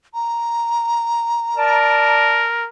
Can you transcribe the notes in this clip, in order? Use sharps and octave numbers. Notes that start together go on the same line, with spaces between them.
A#5
A#4 D5 A5